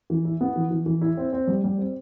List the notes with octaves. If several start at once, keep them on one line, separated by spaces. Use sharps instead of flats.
E3
E4
B3
E3
E3
E3
E4
C4
C4
G3
G3
C4